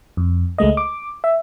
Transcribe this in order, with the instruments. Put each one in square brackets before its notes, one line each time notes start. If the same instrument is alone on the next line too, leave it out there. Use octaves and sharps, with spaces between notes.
[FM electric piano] F2
C#2 G#3 A3 D#5
D6
E5